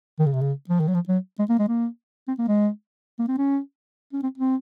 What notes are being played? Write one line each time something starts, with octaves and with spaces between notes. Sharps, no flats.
D#3
C#3
C3
C#3
F3
D#3
F#3
F3
F#3
G#3
A#3
G#3
A#3
C4
A#3
G#3
A#3
C4
C#4
C#4
C4
C4